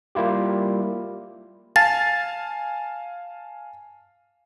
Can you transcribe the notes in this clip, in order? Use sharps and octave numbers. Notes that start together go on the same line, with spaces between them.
G3 A#3 E4 F4 G4
F5 G#5 A5 A6